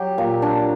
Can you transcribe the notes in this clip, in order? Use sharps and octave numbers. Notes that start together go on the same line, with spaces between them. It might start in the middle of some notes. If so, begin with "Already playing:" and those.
Already playing: F#3 G4
A#2
D4